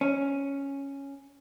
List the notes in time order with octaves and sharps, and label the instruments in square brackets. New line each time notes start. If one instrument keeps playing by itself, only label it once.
[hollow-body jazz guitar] C#4